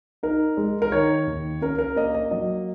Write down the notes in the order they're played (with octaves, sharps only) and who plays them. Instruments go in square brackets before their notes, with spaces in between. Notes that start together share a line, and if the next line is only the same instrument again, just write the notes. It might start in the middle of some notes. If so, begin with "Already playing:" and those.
[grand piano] D#4 A#4
G#3
A#4
D#3 C#5
D#2
C#4 A#4
A#4
A#3 D#5
D#5
F#3 D#5